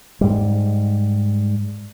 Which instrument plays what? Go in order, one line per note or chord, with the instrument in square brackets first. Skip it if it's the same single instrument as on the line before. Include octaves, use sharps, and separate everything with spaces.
[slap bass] G#2 G3